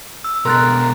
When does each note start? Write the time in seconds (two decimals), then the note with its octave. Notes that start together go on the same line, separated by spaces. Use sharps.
0.24 E6
0.45 B2 G#3 A#4 C6 F#6 A6